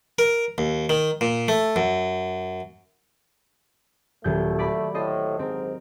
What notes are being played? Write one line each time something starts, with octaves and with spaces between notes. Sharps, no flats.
A#4
D#2
D#3
A#2
A3
F#2
D#1 F#3 A3 G6
D5 B5 D6
A2 A4 C5 D#5
G#2 C4 A#4